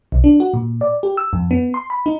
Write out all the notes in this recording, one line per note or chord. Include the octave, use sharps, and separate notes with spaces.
B1
D4
F#4
A#2
D5
G4
E6
F2
B3
C6
B5
D#4